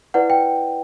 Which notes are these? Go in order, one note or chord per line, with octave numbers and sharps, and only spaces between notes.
E4 B4 D5 F#5
G5